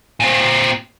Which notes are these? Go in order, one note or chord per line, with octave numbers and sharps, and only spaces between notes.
A#2 C4